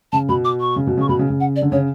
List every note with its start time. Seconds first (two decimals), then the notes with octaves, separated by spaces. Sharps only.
0.12 C#3 A5
0.29 B2 B5
0.45 D6
0.61 C#6
0.76 C#3
0.87 B2
0.97 C#3 C#6
1.09 B2 B5
1.19 C#3
1.30 C#3
1.40 F#5
1.56 D5
1.62 D3
1.72 C#3 C#5